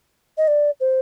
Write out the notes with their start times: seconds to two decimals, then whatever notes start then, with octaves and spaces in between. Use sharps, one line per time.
0.38 D#5
0.48 D5
0.80 C5